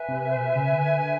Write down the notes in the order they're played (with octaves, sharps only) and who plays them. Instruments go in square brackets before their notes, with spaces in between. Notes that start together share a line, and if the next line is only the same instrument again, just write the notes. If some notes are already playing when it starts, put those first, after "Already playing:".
Already playing: [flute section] B4 E5 G#5
[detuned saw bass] C3
B2
C#3
D3